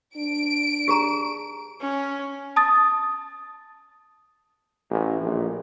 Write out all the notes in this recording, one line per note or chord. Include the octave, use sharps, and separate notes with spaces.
D4 D7
G4 G#4 A#5
C#4
A5 D#6 A6
A1
A#1